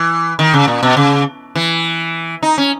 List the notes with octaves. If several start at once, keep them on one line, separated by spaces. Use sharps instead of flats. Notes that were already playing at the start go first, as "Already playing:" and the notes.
Already playing: E3
D#3
C#3
A#2
B2
C#3
E3
D#4
C#4